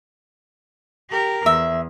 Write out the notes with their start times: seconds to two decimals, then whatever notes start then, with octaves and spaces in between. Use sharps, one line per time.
1.10 G4 A#4
1.46 E2 E5